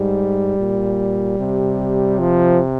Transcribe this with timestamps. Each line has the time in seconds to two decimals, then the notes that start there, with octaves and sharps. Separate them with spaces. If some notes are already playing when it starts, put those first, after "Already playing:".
Already playing: G#2 G3
0.59 A#2
1.39 C3
2.19 F3